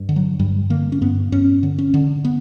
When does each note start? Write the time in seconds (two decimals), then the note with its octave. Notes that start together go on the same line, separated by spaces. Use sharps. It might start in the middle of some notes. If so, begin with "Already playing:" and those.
Already playing: G2
0.09 D3
0.16 F#3
0.39 G2 G3
0.70 D3 A#3
0.92 C#4
1.01 G2 B3
1.32 G2 C#4
1.63 D3
1.78 C#4
1.94 D3
2.25 B3